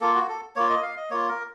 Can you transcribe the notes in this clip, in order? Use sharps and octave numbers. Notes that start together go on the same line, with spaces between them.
A#3 F4 A4
F#4
A4
A#3 F4 C#5
D#5
F5
D#5
A#3 F4 C#5
A#4